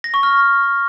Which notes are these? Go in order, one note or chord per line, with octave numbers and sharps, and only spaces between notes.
A#6
C#6
F6